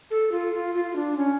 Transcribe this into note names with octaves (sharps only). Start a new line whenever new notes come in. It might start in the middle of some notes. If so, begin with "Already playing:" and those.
A4
F4
F4
F4
F4
D4
C#4